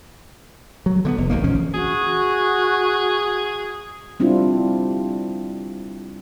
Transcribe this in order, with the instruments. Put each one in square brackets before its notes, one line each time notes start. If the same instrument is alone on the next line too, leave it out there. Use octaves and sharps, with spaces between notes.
[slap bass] F#3
D3 A3 B3
F1
D1 A#1 D#3 A#3
D2 E3 F3 C#4
[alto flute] F#4 [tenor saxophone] G#4
[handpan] G3 C4 D4 E4 F4